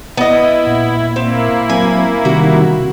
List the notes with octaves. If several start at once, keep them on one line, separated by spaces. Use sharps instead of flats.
B3 E4 D#5
A#2
A#3 C4 E4
F#3 C4 G#5
C3 D#3 G3 F#4